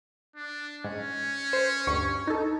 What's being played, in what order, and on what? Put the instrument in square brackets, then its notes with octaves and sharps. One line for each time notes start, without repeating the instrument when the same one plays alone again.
[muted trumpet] D4
[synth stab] G#2 [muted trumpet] C#4
[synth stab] C5
D2 G2 C#6
D#4 A4